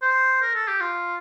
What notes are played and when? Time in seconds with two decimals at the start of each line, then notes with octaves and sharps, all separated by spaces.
0.02 C5
0.42 A#4
0.55 A4
0.68 G4
0.81 F4